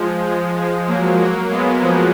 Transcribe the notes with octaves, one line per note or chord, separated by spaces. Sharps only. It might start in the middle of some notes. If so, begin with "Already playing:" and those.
Already playing: F3 G#3
F3 G#3
F3 G#3
F#3 A#3
F#3 A#3
G#3 B3
F3 G#3